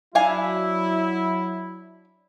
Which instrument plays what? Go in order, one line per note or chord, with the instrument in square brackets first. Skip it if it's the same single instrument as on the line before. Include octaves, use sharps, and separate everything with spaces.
[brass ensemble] F#3 E4 [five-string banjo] D4 F5 G#5